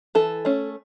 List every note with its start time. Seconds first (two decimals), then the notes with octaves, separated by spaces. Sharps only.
0.15 E3 A4
0.45 A3 C#4